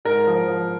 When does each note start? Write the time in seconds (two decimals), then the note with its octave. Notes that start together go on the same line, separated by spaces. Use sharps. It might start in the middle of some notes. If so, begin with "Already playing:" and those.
0.05 G#2 A#4
0.27 F3
0.48 F3